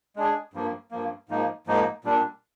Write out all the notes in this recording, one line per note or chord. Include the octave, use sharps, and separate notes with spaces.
G#3 D4 G#4
G2 F3 A#3
G2 F3 A#3
G#2 F3 A#3 D#4
G#2 F3 A#3 D#4
A#2 G3 D4